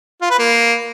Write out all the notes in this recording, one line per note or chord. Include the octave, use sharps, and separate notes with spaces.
F4
B4
A#3